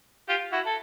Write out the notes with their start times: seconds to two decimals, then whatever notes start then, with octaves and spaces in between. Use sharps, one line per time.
0.29 F4 G4
0.52 E4 F#4
0.66 A4